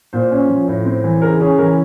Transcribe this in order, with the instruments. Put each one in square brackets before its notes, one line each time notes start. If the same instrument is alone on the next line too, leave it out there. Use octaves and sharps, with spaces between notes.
[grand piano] A#2 C5
C#4
F3
A2
C4
E3
C#3 A#4
C#4 G#4
E3 A#4